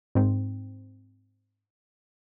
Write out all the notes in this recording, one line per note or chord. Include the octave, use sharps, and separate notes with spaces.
G#2 C4